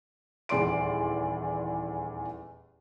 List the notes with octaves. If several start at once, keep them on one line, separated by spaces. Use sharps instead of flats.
D#1 E2 D5 C6 D7